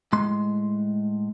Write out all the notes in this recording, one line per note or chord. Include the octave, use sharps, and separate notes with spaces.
A2 G#3 C6